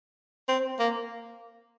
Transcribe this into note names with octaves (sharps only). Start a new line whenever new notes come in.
C4
A#3